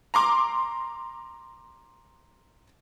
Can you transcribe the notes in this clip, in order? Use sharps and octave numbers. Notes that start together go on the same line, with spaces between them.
A#5 C6 D6